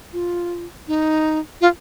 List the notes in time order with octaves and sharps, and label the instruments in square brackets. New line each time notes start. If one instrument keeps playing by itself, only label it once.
[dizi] F4
D#4
F4